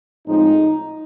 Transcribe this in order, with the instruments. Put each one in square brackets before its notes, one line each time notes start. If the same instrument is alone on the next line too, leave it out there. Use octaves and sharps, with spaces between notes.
[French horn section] A2 F3 G#3 C4 D#4